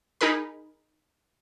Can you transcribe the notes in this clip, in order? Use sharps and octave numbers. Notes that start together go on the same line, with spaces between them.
D#4 G#4 A#4 B5